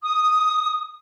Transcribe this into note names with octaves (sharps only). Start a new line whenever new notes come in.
D#6